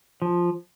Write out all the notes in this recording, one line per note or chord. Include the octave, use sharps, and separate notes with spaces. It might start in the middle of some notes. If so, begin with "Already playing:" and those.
F3